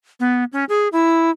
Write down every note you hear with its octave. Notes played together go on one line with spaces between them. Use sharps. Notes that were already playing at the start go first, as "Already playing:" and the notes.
B3
C#4
G#4
E4